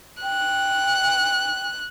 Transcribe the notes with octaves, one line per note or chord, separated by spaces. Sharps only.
G5 F#6